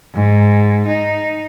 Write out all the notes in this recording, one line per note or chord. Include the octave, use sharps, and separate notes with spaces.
G#2
D#4